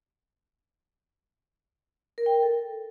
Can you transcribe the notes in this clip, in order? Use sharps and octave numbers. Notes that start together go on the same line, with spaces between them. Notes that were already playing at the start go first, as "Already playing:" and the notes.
A#4
G5
A#4
A4